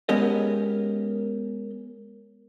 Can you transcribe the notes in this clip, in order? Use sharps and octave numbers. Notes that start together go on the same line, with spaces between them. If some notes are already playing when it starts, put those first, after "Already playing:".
G#3 B3 C#4 G4 A#4 D#5